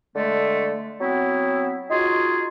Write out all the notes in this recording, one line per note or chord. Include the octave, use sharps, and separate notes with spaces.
D3 G#3 A3
F#3 B3 C4 E4
D#4 F4 F#4 G#4